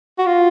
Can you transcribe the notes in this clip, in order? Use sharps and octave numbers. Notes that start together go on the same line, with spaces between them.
F#4
F4